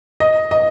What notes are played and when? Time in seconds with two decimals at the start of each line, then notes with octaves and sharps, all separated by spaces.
0.20 D#5
0.51 D#5